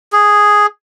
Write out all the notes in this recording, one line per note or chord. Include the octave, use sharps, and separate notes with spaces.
G#4